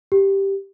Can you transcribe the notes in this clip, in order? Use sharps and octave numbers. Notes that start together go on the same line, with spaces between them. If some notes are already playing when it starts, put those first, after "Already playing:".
G4